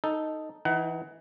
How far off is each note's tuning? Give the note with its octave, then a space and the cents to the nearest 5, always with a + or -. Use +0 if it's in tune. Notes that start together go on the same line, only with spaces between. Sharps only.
D#4 +0 A4 +0
E3 +0 D#4 +30 F#5 +25